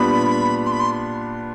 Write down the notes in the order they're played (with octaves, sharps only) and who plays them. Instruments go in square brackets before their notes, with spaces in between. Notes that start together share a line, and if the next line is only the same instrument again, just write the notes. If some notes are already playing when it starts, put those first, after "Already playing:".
Already playing: [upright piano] A#2 G3 B3 D4 [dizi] B5
[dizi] C6
B5
C6